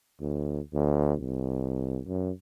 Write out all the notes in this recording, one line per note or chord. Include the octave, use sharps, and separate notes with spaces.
D2
D2
C2
F#2